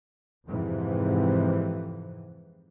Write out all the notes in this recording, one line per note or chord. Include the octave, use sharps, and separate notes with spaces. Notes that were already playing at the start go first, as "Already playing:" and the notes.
F2 G#2 C3 E3